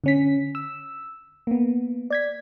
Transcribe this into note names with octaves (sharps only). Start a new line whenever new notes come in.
D3 C#4 B6
E6
A#3 B3
D5 G#6 B6